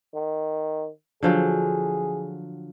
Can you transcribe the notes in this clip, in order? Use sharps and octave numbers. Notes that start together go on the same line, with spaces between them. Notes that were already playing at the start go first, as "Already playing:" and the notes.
D#3
D3 F3 F#3 G#4